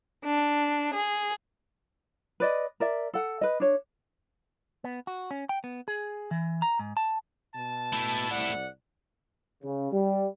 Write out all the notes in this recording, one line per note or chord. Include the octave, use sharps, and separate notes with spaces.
D4
G#4
B4 D5 D#5
A#4 D5 E5
A4 F#5
B4 D#5
D4 C#5
B3
F#4
C#4
G5
B3
G#4
E3
A#5
G#2
A5
B2 A5
A3 E4
C2 D5 F#5
C#3
G3